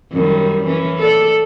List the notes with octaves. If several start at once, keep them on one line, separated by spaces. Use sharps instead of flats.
F#2 D#3 G3
E3 C#4
A4 D5